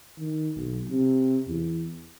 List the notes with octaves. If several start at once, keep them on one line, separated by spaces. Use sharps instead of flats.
D#3
B1
C3
E2